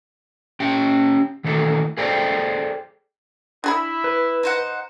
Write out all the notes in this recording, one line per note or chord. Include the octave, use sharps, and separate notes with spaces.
C#4 G4 G5
D#3 E3 A3 A4
G#4 A4 C5 D5 G5
D4 E4 G#4 B5
B4
D#4 C5 F#5